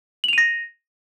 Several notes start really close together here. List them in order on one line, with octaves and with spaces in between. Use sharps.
F#7 F7 D#7 A#6